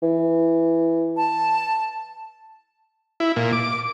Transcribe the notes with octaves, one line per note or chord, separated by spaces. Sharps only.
E3
A5
E4
A#2
D6